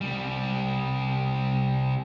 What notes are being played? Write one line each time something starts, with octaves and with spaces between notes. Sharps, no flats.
C2 G3